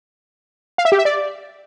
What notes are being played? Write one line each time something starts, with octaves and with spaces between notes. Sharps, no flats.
F5
E5
G4
E5
D5